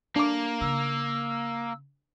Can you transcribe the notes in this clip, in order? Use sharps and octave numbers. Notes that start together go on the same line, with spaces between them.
A#3 D4 D6
C#3 E6